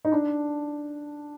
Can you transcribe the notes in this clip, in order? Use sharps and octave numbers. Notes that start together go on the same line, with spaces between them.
D#4
D4